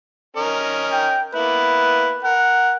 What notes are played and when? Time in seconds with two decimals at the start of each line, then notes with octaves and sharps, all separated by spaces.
0.37 C#4 A#4 D#5
0.92 G5
1.35 A#3 B3 E4 B4
2.25 A#4 F#5